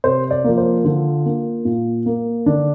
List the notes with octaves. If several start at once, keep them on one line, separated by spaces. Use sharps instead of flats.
C3 C5
D5
F3 A#3
C5
D3 F4
A#3
A#2
A#3
D3 D4